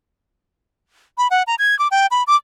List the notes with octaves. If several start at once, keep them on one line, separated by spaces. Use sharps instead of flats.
B5
F#5
A#5
G#6
D6
G5
B5
D6